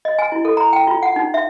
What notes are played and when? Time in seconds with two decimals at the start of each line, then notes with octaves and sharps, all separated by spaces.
0.05 D#5
0.19 G#5
0.32 E4
0.45 A4
0.57 A#5
0.73 G5
0.87 F4
1.03 F#5
1.16 D#4
1.34 E5